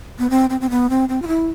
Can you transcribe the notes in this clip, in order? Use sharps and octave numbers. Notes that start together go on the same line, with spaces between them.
B3
C4
C4
C4
B3
C4
C4
F4
E4